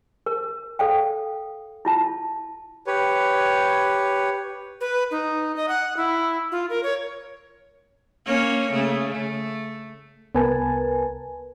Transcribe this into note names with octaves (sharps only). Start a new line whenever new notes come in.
A#4
A4 D5 F5 G5
E4 F4 A5
G4 B4 C#5
B4
D#4
D#5
F#5
E4
F4
A#4
C#5
A#3 C#4 C#5
C#3 A3
A3
C2 B3 A#4 B4 G#5 A5